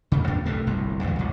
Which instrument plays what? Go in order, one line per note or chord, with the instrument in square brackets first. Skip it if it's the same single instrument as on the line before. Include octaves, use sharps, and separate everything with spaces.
[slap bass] D1 D2 C#3
E2 A#2 D4
B1 F2 C3 A3
G1 C2 A2
C#2 G2 E3 F#3
A1 F2